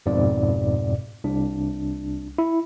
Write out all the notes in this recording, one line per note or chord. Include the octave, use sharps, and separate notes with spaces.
G1 F2 G#2 B2 D5
C2 D4
E4